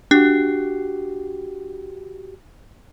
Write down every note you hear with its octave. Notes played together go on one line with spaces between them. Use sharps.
D4 F#4 G4